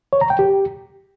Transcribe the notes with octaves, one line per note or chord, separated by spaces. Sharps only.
C#5
A#5
G5
G4